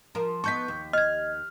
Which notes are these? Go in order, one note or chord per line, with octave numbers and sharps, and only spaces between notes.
F3 A#4
B3 D#4 A4 C#6 G6 B6
D#2
D#5 F6 G#6